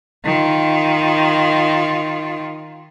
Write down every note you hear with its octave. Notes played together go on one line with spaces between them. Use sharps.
D#3 F4